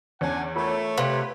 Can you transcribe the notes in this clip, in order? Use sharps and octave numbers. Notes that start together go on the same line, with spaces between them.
E2 C#4 D4 F#5 G#5
A3 F4 A#4 C#5
C3 B4 F5